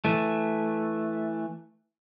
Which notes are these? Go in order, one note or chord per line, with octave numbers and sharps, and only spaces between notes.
E3 A3